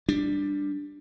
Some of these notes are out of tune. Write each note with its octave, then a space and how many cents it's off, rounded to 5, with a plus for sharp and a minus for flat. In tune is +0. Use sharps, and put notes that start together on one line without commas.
G3 +10 D4 +5